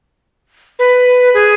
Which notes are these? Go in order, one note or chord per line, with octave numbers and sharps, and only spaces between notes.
B4
G#4